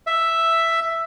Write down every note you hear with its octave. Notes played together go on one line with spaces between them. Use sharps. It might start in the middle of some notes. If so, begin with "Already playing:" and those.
E5